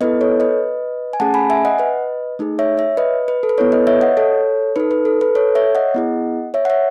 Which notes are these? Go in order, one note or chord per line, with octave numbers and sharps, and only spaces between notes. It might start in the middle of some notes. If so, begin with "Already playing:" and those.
B3 E4 A4 B4 D#5
A4 C#5
B4 D#5
G#5
A3 C#4 G#4 F#5 A5
G#5 B5
E5 G#5
D#5 F#5
B4 D#5
A3 D#4 G#4
C#5 E5
C#5 E5
B4 D#5
B4
A4
B4
B3 E4 A4 C#5
B4 D#5
C#5 E5
D#5 F#5
A4 C#5
D#4 A4 B4
B4
A4
B4
A4 C#5
C#5 E5
D#5 F#5
B3 E4 G#4
C#5 E5
F#5
C#5 E5